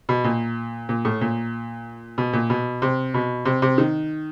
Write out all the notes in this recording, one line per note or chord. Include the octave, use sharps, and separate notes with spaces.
B2
A#2
A#2
A2
A#2
B2
A#2
B2
C3
B2
C3
C3
D#3